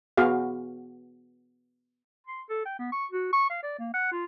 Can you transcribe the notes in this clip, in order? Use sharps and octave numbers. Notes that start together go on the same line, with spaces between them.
B3 F#4 G#4 F5
C6
A4
G5
B3
C#6
F#4
C#6
F5
D5
A#3
F#5
F4